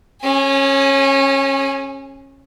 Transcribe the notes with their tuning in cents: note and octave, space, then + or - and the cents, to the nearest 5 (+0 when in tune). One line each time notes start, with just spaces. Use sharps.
C#4 -20 G#4 +5